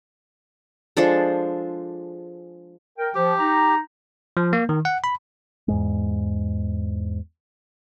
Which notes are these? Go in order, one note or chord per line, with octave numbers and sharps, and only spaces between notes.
F3 G#3 D4 A4
A#4 G5
F3 G4
D#4 A#5
F3
A#3
D#3
F#5
B5
E2 G#2 G#3